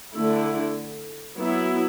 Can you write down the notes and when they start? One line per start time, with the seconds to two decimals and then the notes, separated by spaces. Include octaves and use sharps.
0.16 D3 A3 E4
1.37 F#3 B3 E4